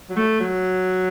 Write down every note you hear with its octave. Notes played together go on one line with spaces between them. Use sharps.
F#3
A3
F#3